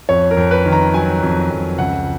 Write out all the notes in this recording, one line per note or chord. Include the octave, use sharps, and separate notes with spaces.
F2 C#5
A#4
F2
B4
D#3
A#5
F#3 G#5
F2
F2
C#2 F#5